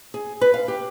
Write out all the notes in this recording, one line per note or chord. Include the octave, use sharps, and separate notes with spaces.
G#4
B4
F5
G4